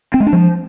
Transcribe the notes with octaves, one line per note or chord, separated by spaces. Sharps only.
C4
G#3
D4
F3